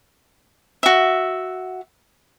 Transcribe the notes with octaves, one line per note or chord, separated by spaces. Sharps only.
F#4 E5